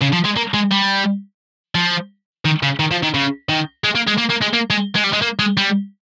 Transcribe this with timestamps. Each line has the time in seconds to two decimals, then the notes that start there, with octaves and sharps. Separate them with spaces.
0.02 C#3
0.13 F3
0.25 G#3
0.37 A#3
0.54 G#3
0.72 G3
1.75 F3
2.45 D#3
2.63 C#3
2.79 D#3
2.91 F3
3.03 D#3
3.14 C#3
3.49 D#3
3.84 G#3
3.95 A#3
4.07 G#3
4.18 A#3
4.29 A#3
4.41 G#3
4.53 A#3
4.70 G#3
4.96 G#3
5.04 G3
5.13 G#3
5.22 A#3
5.39 G#3
5.57 G3